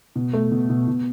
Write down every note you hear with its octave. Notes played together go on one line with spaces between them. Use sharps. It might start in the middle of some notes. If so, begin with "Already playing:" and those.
B2
A3
B2
B2
B2